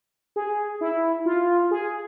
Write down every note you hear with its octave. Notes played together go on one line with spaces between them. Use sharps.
G#4
E4
F4
G#4